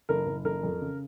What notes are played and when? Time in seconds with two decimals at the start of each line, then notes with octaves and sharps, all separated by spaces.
0.09 F#1 A#4
0.27 F#1
0.45 F#1 A#4
0.63 F2
0.81 C#3